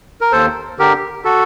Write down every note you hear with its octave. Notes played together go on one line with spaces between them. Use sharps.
A#4
D#2 A4 C5
D3 G4 A#4
F#4 A4